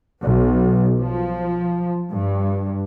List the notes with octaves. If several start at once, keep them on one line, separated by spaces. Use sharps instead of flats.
B1
F3
G2